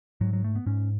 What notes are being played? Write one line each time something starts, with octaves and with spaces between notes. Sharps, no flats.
G#2 F#3
F#3
A3
B3
G#2 C#4